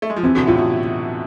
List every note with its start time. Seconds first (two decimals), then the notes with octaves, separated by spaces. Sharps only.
0.02 A3
0.10 G#3
0.16 F3
0.23 C3 E3 C4
0.35 B2 D3
0.47 A2 C3 F4
0.58 B2